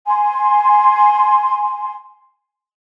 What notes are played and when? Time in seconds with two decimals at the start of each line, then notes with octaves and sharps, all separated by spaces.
0.07 G#5 C6